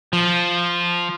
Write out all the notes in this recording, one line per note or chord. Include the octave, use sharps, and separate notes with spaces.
F3